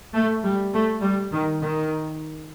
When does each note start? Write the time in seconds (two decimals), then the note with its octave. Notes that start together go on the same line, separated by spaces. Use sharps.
0.14 A3
0.43 G3
0.73 A3
1.02 G3
1.31 D#3
1.60 D#3